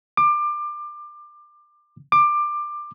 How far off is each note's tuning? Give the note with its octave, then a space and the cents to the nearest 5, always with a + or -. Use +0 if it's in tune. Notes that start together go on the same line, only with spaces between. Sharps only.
D6 +25
D6 +20